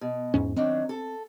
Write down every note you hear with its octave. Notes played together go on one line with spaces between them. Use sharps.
B2
E2 G#2 C#4
D#3 F#3 C4 D4
A4